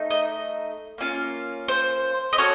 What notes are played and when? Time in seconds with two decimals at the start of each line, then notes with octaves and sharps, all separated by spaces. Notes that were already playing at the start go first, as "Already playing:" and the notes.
Already playing: A3 D#4
0.10 D#5
0.98 A#3 C#4 F4
1.68 C5
2.33 D#5
2.38 C#4 F#4 A4 C#5